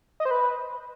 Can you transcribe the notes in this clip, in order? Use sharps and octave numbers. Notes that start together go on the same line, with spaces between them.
D#5
C5
B4